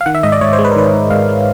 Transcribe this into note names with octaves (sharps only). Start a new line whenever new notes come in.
F5
D#3 F#5
E5
G#2 D#5
D5
G#2 C#5
C5
G#3
B4
A#4
D#3 B4
G#2
G#2 F5
G#3